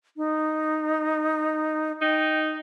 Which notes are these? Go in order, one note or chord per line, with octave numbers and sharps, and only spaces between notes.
D#4
D#4 G5